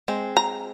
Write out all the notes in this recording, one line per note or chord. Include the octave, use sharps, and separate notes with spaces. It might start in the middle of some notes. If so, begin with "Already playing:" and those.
G#3 C4
A#5